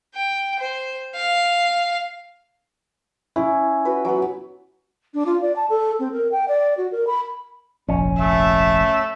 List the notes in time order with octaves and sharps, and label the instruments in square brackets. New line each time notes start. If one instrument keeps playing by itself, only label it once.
[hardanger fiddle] G5
C5
F5
[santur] C#4 [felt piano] E4
[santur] F#4 B4
F#3 B3
[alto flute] D4
F4
D5
A5
A4
C4
A#4
G5
D5
F#4
A#4
B5
[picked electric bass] F1 A#1 [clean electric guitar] C#4
[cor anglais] A3 [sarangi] E5